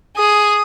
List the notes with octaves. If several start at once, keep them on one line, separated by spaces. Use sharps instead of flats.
G#4 D#6